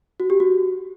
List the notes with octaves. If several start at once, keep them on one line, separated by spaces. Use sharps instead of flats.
F#4
G4
F#4